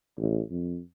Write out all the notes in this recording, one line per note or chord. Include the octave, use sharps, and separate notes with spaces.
A1
F2